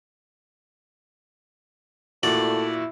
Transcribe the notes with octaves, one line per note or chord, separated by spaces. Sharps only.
A#2 A3 E4 F#4 D5